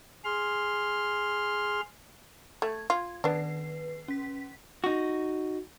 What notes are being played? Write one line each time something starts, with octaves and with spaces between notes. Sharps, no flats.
G#4 C6 F6
A3 G#6
F4
D#3 B3 D4 B4 C7
C#4 B6
D#4 F#4